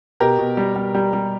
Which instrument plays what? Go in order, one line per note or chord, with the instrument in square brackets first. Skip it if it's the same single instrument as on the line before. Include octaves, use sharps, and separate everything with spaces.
[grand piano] B2 G4 A#4
B2
G3
G3
G3
G3